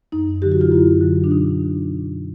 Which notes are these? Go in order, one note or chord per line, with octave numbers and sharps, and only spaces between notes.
F#2 D#4
D3 F#3 G4
F#4
F4
F#2 E4
D3 F#3
D4
B2 D#4